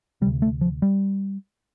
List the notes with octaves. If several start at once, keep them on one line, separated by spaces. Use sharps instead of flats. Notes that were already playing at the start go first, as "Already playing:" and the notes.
D2 C3 G3
A3
F3
G3